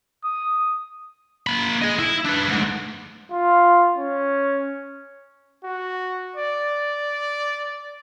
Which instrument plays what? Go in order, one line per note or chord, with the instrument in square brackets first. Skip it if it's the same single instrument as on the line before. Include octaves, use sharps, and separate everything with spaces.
[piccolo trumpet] D#6
[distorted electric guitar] A#3 B5
G#4 D#5
E4
D4 B4
D2 G#2
[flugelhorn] F4
C#4
[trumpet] F#4
D5